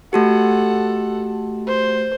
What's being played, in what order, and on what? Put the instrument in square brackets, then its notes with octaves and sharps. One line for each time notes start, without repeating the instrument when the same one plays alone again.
[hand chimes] A3 F#4 G4 [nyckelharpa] A4 F#5
[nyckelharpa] C5